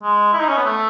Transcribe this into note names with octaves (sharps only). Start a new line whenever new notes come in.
G#3
E4
D#4
C#4
B3
A3